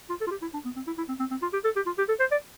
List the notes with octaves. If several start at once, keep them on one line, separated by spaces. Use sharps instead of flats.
F4
A4
F4
G4
E4
D4
B3
C4
E4
E4
C4
C4
C4
F4
G4
A4
G4
F4
G4
A4
C5
D5